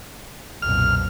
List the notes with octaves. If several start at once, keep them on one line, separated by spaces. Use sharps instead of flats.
B1 F2 A#2 F6